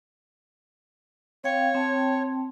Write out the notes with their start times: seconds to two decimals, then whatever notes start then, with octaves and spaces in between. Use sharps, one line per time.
1.44 C4 C#5 F5 G5
1.75 C4 G5 A5